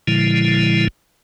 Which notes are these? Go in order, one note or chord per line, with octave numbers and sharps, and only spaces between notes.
A#2 D3 F3 G#3 E4